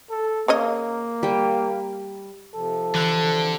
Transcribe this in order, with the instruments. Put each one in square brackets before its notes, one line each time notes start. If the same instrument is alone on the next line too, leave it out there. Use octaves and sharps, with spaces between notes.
[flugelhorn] A4
[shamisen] C#3 C#5 D#5 [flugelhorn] A#3
[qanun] G3 G5
[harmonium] C3 F3 [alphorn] A4
[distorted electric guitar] D3 [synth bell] E3 F#6